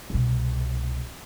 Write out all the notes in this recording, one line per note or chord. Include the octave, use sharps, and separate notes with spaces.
C2 B2